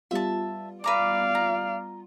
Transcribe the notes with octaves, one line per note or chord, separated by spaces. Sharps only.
G3 B3 F4 E5 A5
B4 D5 F5 A#5 D6
A#5